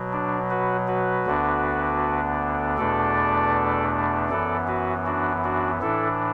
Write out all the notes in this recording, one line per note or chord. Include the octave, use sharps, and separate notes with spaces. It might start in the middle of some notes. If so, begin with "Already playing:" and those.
Already playing: B2 F#3
D4
F#4 B4
F#4 B4
D2 D3 B3 D4
E2 B2 A3 D4 A4 D5
F#2 E3 B3 A4 D5
F#4 B4
D4 F#4
D4 F#4
A2 E3 D4 E4 A4